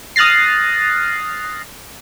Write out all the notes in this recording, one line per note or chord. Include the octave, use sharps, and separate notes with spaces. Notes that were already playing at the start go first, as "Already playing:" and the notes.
D#6 F6 F#6 A6 A#6 C7